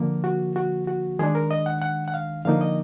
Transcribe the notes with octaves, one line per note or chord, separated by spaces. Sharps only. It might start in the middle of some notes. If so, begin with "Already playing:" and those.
Already playing: D3 F3 A#3
F#4
F#4
F#4
D#3 G#3 D4 G#4
A#4
D#5
F#5
F#5
F#5
F5
D3 F3 A#3 D#4 F5
D#5